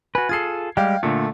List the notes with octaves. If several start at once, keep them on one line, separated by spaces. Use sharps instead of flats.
F#4 B4 G#5
F4 G#4 A4 G#6 C7
G3 G#3 G4 F5 G5
A#2 D3 A3